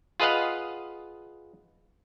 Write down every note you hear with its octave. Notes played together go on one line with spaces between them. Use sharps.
F4 G#4 B4 D#5 F5 F#5